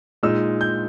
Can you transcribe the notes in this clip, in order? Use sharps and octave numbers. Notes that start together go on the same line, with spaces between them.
A#2 G#3 D#4 E6
G6